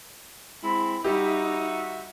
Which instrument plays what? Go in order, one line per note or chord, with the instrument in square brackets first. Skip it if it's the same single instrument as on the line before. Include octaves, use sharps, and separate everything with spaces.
[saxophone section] G#3 C4 E4 [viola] B5
[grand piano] G3 G4 [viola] D#4 [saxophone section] F#4 E5